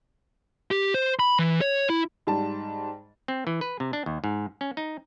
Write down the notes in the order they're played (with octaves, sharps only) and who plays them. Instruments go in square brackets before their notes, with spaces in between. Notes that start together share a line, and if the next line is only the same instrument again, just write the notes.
[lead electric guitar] G4
C5
B5
E3
C#5
E4
[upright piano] G#2 G3 A5
[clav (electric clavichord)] C4
E3
B4
C3
D4
D#2
G#2
C#4
D#4